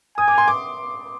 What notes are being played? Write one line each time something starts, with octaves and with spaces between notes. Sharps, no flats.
G#5 D#6
D6
C6
D6